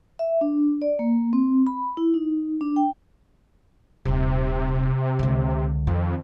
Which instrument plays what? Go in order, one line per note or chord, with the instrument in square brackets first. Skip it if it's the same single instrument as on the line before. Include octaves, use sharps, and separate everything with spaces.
[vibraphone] E5
D4
D5
A#3
C4
B5
E4
D#4
D4
G5
[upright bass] D#1 D#4 [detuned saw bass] C3
[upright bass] C#2 D3
[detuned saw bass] F2 [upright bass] D#3